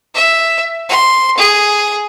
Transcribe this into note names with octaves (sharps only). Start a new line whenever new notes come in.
E5
C6
G#4